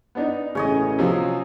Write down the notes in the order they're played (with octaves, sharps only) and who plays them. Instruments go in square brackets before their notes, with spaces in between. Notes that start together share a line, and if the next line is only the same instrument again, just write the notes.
[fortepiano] B3 D4 D#4
[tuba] A1 [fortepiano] C#3 [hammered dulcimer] C#4 C#5 D#5
[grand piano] C3 F3 F#3